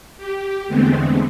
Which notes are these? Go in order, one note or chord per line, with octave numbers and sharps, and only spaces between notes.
G4
E2 D3 G#3 A3 B3 C4